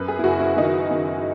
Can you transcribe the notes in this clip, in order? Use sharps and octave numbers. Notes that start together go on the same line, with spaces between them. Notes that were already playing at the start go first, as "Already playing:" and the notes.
Already playing: F#2 B4
G#4
E4
F#1 F#4
E4
D#3 D#4
D#3